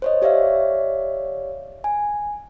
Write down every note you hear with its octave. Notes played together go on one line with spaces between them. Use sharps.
C5 C#5 D#5
G4 C#5 D5 E5 F5
G#5